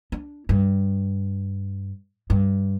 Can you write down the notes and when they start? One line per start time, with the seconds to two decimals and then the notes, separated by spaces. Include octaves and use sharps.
0.12 D4
0.49 G2
2.30 G2